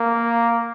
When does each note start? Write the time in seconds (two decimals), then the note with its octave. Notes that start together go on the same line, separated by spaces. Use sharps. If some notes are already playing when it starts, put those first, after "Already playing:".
Already playing: A#3